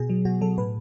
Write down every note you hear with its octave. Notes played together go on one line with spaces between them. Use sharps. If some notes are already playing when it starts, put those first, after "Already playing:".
Already playing: B2 G#4
F#3
B2 F#4
F#3 A4
A2 B4